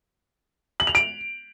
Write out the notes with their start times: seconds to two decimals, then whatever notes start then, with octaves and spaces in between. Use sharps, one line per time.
0.80 F#7
0.87 F7
0.95 D7